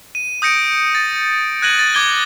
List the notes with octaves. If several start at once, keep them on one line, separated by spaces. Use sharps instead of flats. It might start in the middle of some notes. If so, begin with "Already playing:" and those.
D#7
D#6 G6 A#6 C#7 D7
A6
F#6 G#6 A#6 D#7 F#7
A6
D6 G#6 A6 G7